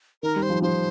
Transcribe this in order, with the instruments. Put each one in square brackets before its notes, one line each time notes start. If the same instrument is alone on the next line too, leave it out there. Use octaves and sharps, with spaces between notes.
[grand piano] D#3 [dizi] A#4
[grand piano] G3
[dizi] C5
[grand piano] F3
[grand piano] F3 [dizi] C5